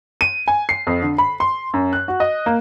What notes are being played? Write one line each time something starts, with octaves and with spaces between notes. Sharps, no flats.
D#7
G#5
C7
F2
D3
B5
C6
F#2
F#6
F#4
D#5
A#3